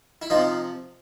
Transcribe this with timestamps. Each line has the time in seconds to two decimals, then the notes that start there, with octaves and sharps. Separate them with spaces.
0.22 E4
0.30 C3 F3 D#4 F4